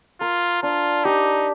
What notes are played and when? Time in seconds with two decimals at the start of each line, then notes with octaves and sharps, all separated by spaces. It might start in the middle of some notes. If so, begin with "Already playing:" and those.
0.21 F4 A#4
0.63 D4 F4
1.05 D#4 G4